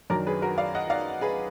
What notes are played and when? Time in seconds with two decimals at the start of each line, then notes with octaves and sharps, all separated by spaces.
0.10 F#2 D#3 F#3 D4 A#4 D5
0.27 G#4 B4
0.42 F#4 A#4
0.58 D5 F5
0.75 D#5 F#5
0.90 D5 F5
1.21 G#4 B4